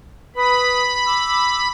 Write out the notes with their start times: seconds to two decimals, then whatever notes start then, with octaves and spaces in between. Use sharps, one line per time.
0.36 B4 B5 D#6
1.07 D6 E6